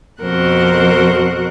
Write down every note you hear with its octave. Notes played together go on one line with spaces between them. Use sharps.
F2 B2 F#4 A#4 C5 F#6